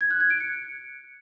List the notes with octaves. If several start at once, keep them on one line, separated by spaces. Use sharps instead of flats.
G#6
F#6
G#6
D7
C#7